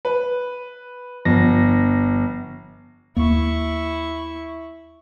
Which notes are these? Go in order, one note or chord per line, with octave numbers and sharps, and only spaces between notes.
B4
G1 F3 A#6
D#2 A#3 E4 C#6